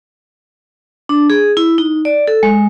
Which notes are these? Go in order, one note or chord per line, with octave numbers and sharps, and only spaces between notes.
D4
G#4
E4
D#4
D5
A4
G#3